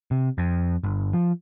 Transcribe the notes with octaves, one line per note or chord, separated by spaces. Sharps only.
C3
F2
G1
F3